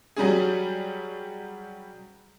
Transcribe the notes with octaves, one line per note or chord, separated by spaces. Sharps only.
F#3 G3 C#4 G#4